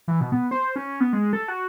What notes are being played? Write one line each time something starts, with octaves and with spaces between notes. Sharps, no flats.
E3
B2
B3
C5
C#4
B3
G#3
A4
F#4